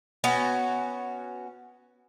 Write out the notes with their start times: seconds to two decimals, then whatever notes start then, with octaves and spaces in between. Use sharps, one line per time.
0.24 B3 C#4 F#4 G#5